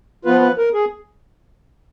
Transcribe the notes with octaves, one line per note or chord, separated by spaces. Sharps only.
F3 B3 F4 B4
B4
A#4
G#4